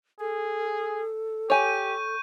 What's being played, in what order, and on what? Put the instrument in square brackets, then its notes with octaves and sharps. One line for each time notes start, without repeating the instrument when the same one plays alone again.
[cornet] G#4 [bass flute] A4
[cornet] G4 [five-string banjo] C#5 G#5 [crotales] C#6 G6 D#7